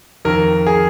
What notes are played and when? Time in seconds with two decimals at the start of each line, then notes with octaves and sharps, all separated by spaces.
0.25 F2 D#3 A#4
0.67 G#4